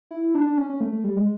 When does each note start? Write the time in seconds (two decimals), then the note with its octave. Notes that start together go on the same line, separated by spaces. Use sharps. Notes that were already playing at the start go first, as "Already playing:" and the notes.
0.11 E4
0.34 D4
0.47 D4
0.57 C#4
0.70 C#4
0.81 A3
0.92 A3
1.04 G3
1.17 G#3